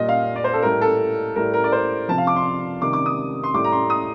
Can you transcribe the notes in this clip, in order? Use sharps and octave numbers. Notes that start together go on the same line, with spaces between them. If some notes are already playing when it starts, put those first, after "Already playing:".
Already playing: A#2 G3 D#5
F5
D5
C5
A4
A2 G3 A#4
A4
A2 G3 A#4
A#4
D5
C5
C3 F3 A5
F5
D6
C6
C3 D#3 G3 D6
D6
D#6
C6
A2 G3 D6
A#5
C6
D#6